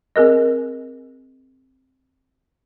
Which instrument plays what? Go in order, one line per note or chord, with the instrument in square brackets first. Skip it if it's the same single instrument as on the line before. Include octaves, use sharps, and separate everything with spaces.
[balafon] C4 G#4 A#4 D#5